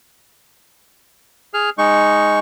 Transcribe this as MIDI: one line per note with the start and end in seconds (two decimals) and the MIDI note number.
1.54 1.70 68
1.54 1.70 89
1.78 2.40 56
1.78 2.40 63
1.78 2.40 85